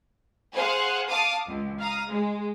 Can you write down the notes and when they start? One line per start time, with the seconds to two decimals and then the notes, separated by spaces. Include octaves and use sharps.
0.53 G#4 C5 F5 F#5
1.09 F5 A5 D6 D#6
1.47 C#2
1.79 F5 A#5 D#6
2.08 G#3